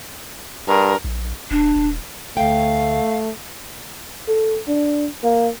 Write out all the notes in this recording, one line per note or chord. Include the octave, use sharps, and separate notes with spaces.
G2 A#4
A#1
D#1 D4
D#1
D2 A3 F5 G5
A4
D4
A#3